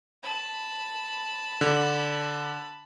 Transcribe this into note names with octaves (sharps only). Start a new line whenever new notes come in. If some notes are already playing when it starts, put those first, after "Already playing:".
A5 B5
D3